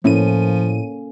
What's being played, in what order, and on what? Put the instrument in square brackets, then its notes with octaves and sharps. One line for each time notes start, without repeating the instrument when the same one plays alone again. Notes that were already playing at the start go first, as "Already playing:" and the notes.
[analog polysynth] A2 D#7 [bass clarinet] F3 [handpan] A#3 C#4 A4